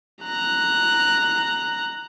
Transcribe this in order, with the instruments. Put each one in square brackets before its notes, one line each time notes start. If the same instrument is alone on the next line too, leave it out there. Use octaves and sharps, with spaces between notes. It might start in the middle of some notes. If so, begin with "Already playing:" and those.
[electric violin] A#5 F#6